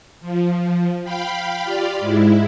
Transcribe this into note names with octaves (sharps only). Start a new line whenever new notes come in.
F3
F5 G5 B5
F4 G4 D5 F5
G#2 G#3 E4